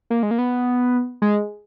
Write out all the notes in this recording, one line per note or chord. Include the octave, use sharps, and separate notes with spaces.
A#3
G#3
A#3
B3
G#3